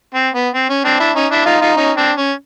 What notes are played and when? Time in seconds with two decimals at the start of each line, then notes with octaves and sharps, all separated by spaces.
0.14 C4
0.34 B3
0.54 C4
0.69 C#4
0.85 C4 D4
1.00 D4 E4
1.15 C#4 D#4
1.31 D4 E4
1.46 D#4 F4
1.61 D#4 F4
1.77 C#4 D#4
1.96 C4 D4
2.18 C#4